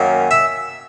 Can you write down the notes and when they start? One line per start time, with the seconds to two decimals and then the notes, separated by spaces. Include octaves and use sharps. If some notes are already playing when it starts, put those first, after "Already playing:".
Already playing: F#2 D#3 A#3 C#4
0.31 E5